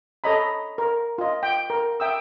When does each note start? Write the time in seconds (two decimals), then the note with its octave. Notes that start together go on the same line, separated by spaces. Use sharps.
0.24 A4 C#5 D#5 A#5 B5
0.78 A#4
1.18 F4 D#5
1.43 G5
1.70 A#4
2.00 E5 G5 D#6 E6